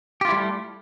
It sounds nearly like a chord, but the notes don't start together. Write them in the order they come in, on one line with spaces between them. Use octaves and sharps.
G4 F4 E4 G3 A3